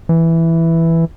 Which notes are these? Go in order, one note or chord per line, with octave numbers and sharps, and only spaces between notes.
E3